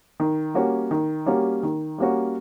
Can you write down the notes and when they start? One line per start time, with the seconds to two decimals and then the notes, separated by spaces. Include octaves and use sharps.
0.20 D#3
0.54 G3 A#3 C#4 F#4
0.91 D#3
1.26 G3 A#3 C#4 F#4
1.63 D#3
1.98 G3 A#3 C#4 F#4